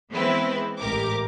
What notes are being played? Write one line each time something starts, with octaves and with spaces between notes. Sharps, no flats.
E3 G#3 B3 C4 E4 B4
A1 G#2 G4 A#4 D6